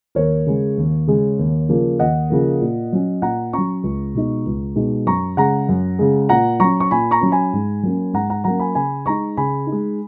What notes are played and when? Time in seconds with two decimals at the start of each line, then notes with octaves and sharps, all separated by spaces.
0.15 D#2 A#4 C#5
0.46 C#3 G#3
0.78 D#2
1.07 C#3 G#3
1.39 D#2
1.69 C#3 F3 A#3
1.99 D#2 D#5 F#5
2.30 C#3 F3 A#3
2.61 A#2
2.93 F#3 C#4
3.22 A#2 F#5 A#5
3.53 F#3 C#4 A#5 C#6
3.83 C#2
4.15 B2 G#3 D#4
4.46 C#2
4.76 B2 G#3 D#4
5.06 F#2 A#5 C#6
5.37 C#3 G#3 F#5 A#5
5.69 F#2
5.99 C#3 G#3
6.29 A#2 F#5 A#5
6.60 F#3 C#4 A#5 C#6
6.80 C#6
6.91 A#2 G#5 B5
7.11 A#5 C#6
7.21 F#3 C#4
7.32 G#5 B5
7.53 G#2
7.83 F#3 A#3 C#4
8.13 G#2 F#5 A#5
8.30 F#5 A#5
8.44 F#3 A#3 C#4 F#5 A#5
8.59 G#5 B5
8.75 C#3 G#5 B5
9.06 G#3 D#4 A#5 C#6
9.37 C#3 G#5 B5
9.67 D#4
9.72 G#3